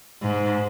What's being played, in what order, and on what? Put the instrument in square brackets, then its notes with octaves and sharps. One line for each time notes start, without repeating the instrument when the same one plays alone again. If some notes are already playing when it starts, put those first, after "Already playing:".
[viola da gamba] G#2